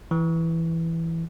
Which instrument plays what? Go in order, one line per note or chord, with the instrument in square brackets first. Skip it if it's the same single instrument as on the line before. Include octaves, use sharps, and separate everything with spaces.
[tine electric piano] E3